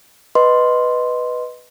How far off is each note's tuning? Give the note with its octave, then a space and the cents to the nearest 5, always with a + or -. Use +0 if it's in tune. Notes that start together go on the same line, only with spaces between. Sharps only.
B4 +0 D#5 +0 C6 +0